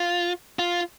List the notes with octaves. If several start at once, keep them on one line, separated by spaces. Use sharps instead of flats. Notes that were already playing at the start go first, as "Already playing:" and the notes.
Already playing: F4
F4